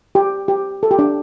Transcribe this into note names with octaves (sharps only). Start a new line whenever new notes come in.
G4
G4
A4
G4
D4